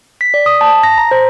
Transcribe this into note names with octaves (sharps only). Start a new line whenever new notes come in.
B6
D5
D#6
A5
A#6
A#5
C5